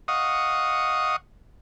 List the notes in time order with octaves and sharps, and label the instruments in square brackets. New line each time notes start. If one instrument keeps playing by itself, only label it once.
[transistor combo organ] D#5 F5 F#5 C#6 D#6